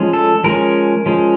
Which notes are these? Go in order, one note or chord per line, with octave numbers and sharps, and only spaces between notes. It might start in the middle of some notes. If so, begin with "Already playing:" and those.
Already playing: F3 G#3 C#4
A4
F3 G#3 C#4 A#4
F3 G#3 C#4